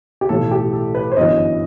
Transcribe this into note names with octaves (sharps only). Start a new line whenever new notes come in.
G4
B1 A2 E3 A4
G4
A4
B4
C5
G1 F#2 E3 D#5